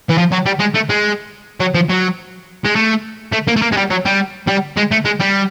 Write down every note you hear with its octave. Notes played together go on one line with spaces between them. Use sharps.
E3
F3
F#3
G3
G#3
A3
G#3
F#3
F3
F#3
G#3
A3
A3
A#3
A3
A#3
G#3
G3
F#3
G3
G3
G#3
A3
G#3
G3